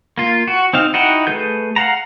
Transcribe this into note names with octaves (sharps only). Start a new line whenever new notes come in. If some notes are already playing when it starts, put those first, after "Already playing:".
A#3 F4
F#4
C4 D#4 F5
D#4 E4 F#4 F#5 G5
A3 G#4 B4 G6
F5 F#5 A#5